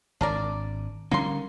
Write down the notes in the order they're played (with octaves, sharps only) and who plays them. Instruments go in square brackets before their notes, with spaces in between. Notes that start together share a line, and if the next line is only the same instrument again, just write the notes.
[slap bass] G#1 [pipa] D4 A#4 D5
[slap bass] D3 G3 C#4 [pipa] A#3 C6